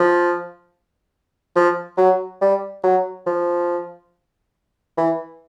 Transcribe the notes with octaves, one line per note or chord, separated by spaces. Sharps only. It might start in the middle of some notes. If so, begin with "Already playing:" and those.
Already playing: F3
F3
F#3
G3
F#3
F3
E3